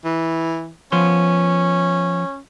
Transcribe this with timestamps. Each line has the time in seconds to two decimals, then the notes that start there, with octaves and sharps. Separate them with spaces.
0.05 E3
0.92 F3 B3 C#4 C6